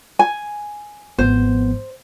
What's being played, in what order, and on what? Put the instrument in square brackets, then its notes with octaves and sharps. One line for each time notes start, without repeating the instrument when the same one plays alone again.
[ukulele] G#5
[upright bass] G#1 F3 [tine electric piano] B3 [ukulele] C5